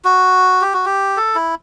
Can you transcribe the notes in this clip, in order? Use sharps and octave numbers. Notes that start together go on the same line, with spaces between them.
F#4
G4
F#4
G4
A4
E4